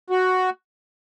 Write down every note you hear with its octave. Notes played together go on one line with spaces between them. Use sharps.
F#4